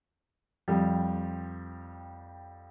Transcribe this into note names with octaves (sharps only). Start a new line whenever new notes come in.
F2 G3